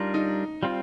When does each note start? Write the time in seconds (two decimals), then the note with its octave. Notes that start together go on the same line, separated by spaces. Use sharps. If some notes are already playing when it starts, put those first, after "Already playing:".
Already playing: G3 D4 D#4 F4 A#4
0.14 D#4
0.62 G3 C4 F4